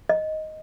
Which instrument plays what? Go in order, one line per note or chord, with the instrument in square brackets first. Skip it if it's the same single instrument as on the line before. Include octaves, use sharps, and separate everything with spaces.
[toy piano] D#5